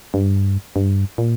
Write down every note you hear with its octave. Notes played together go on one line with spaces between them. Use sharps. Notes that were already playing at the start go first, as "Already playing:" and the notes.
G2
G2
A#2